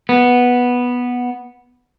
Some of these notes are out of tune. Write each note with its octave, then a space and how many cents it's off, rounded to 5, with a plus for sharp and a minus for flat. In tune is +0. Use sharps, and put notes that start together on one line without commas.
B3 -5